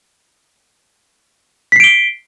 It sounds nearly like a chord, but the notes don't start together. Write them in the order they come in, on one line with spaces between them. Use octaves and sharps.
B6 C7 D7 G7